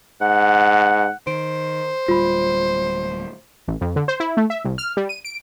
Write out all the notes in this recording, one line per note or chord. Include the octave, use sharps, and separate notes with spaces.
G#2 F#5
D#3 C5 D7
D1 G3 F4 B5
A1
F2
D3
C5
E4
A3
E5
C2
F6
G3
D#7
D7